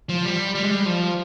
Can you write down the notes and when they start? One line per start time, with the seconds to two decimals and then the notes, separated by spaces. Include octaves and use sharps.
0.09 F3
0.24 G3
0.55 G3
0.63 G#3
0.71 G3
0.86 F3